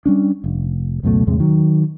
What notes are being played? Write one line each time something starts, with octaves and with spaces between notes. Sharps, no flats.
G3 C#4 D4
F1
C#2 F#2 B2 A3
E2 A2 C3 G#3
D#3 F#3